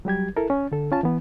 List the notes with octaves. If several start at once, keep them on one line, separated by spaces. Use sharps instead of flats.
F#3 G3 G4 G#6
E4 A4 A#4
C#4
D3 A4
C#4 F4 A5
E3 B3